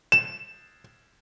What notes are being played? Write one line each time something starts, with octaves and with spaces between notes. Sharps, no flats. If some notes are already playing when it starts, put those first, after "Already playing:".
E7